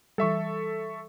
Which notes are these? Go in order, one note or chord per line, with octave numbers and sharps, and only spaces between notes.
E3 G3 A4 E5 C#6